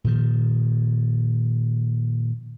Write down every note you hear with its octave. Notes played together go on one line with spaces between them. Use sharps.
A#2 D#3 F3